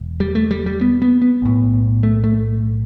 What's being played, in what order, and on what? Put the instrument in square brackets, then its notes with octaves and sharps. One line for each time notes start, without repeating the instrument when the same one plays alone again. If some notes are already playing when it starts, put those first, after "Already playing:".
Already playing: [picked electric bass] E1
G3
A3
G3
G3
B3
B3
B3
B1 A2
A3
A3